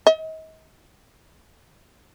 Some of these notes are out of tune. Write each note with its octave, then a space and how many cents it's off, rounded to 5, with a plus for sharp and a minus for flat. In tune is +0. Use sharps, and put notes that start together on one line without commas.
D#5 +40